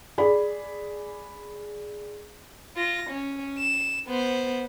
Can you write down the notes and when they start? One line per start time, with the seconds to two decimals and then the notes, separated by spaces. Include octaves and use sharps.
0.18 G#4 D5 B5
2.77 F4 A#6
3.10 C#4
3.59 E7
4.08 B3 C5